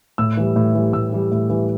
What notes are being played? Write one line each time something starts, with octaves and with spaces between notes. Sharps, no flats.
A2 E6
E3 G3
A2
E3 G3
A2 E6
E3 G3
A2
E3 G3